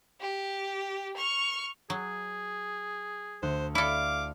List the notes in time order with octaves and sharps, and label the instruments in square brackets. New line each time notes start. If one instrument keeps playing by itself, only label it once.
[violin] G4
C#6 F6
[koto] F#3 [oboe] G#4
[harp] D2 F#6 [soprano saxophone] C5
[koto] E4 A4 [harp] D5 E5 F6 [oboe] F5 [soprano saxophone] D6